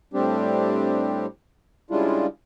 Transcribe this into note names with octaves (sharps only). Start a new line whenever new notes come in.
A2 G3 C4 D4 G4
C#3 G3 G#3 D4 E4 F4